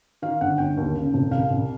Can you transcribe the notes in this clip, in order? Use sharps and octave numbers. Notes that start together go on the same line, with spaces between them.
D#3 F5
G1 F#5
G1 G5
D#2
C#3
F1
C2 F5
C2